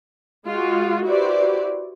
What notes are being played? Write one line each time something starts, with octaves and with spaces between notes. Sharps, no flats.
G#3 F4 F#4
E4 F#4 G4 B4 C5 D5